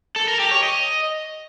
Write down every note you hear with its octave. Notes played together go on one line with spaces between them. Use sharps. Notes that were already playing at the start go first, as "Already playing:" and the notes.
A4
A#4
G4
C#5
D#5